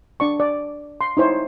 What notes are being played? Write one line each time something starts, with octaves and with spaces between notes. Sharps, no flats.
D4 D5 C#6
D5
C6
D#4 E4 C5 C#5